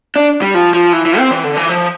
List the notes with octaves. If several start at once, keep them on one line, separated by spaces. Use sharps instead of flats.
D4
G3
F3
F3
E3
E3
C4
E3
D3
E3
F3